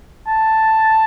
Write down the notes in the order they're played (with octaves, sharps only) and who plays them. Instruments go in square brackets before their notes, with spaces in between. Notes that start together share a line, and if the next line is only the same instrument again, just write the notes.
[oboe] A5